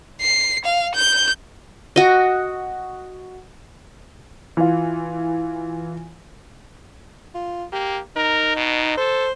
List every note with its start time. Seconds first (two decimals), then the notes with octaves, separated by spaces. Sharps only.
0.21 C7
0.65 F5
0.95 G6
1.96 F#4 D#5
4.57 E3 F4
7.35 F4
7.73 A#3 G4
8.16 D#4 A#4
8.57 B2
8.97 A4 C5